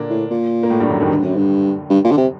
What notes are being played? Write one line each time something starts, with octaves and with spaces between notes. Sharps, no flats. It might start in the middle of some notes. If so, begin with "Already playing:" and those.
Already playing: A#2 D3 A#3 D4
A2
A#2
A#3
A2 A3
G2 G3
F#2 F#3
D#2 D#3
G2 D3
F#2
G2
G2
A#2
D3
C3